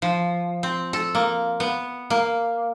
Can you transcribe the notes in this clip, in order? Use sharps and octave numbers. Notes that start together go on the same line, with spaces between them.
F3
C4
A4
A#3
B3
A#3